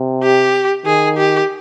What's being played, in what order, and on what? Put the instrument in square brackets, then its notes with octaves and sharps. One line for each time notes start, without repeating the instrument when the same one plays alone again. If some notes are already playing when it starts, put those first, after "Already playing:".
Already playing: [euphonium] C3
[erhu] G4
[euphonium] D#3 [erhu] G#4
[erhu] G4